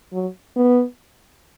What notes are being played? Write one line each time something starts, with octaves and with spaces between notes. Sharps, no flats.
F#3
B3